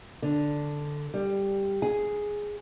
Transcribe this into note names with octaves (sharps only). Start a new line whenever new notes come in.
D3
G3
G#4